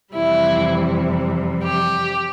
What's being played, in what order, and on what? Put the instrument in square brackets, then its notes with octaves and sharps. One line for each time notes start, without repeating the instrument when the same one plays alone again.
[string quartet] F2 C3 E3 G3 E4
G4